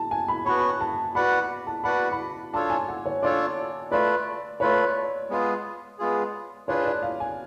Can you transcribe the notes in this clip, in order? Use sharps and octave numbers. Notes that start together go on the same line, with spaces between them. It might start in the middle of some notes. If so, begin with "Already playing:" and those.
Already playing: A5
G#5
B5
B3 F#4 C#5 B5
A5
F#4 B4 D5 F#5 B5
B5
A5
F#4 B4 D5 F#5 B5
B5
D4 F4 A4 C#5 A5
G#5
F#5
C#5
D4 F4 A4 C#5 D5
A3 F4 B4 D5
A3 F4 B4 C#5
G#3 B3 F4 G#4
G#3 B3 F4 G#4
D4 F4 G#4 B4 C#5
D5
F5
G#5